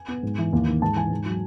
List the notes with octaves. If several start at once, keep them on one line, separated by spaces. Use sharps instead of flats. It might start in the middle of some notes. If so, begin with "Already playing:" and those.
Already playing: G#5
B3
G#2
E3
D#2
D#3
G#2 A5
E3 G#5
G#2
F#3